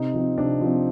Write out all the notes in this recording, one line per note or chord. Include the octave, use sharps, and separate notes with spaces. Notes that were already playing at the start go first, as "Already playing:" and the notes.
Already playing: C3 D#4
F3 C4
C3 D4
F3 C4